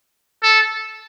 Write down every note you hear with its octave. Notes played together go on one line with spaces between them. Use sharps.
A4